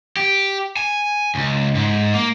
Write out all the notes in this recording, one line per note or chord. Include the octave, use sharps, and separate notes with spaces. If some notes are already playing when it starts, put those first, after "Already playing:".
G4
G#5
C#2
G#2
A#3